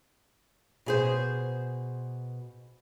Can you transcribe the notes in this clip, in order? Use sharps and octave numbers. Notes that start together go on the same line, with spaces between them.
B2 G#4 C5